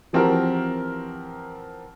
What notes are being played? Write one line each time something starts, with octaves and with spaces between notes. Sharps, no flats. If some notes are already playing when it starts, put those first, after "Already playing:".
E3 F3 C4 F#4 G4 A#4